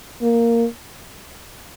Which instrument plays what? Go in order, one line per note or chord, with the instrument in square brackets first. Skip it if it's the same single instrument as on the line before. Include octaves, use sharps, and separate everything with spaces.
[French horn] A#3